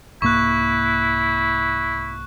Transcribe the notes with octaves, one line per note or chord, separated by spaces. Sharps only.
C2 G#2 A#3 E4 C#6 F#6